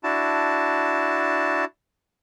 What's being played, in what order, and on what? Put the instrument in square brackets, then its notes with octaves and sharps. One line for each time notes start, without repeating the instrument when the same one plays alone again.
[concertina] D4 E4 F#4 A5